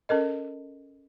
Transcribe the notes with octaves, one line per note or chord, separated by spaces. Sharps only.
C#4 A4 A#4 D#5